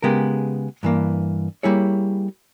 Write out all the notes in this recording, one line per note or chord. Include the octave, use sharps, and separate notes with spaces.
C#3 G#3 B3 G4 A#4
G2 E3 A#3
G3 A#3 E4 G#4 C#5